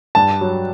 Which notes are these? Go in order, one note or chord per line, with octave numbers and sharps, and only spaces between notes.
G2 A5
F#3